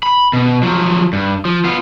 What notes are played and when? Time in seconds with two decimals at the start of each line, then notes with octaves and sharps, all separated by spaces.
0.03 B5
0.33 B2
0.63 F3 F#3
1.13 G2
1.45 F3
1.64 B3 F4